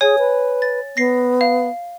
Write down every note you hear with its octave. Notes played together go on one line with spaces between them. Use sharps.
G#4 C#5 G#5
B4
A6
B3 A#6 C7
F5